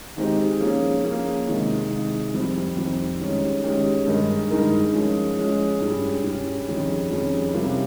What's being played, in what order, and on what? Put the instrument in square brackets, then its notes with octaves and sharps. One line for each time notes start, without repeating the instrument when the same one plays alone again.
[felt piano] D#3 G#3 C4 D#4 G4
F3 A#3 C#4 G#4
F3 A#3 C#4 G#4
C3 D#3 G#3
C3 D#3 G#3
F2 D#3 G3 C4
F2 D#3 G3 C4
D#3 G#3 C#4 G4
D#3 G#3 C#4 G4
G2 D#3 G#3 D#4 A#4
G2 D#3 G#3 D#4 A#4
F3 G#3 C#4
F3 G#3 C#4
G2 G3 C#4 G#4
G2 G3 C#4 G#4
F2 D#3 G3 C#4 G#4
F2 D#3 G3 C#4 G#4
C3 G3 C#4 F4 A#4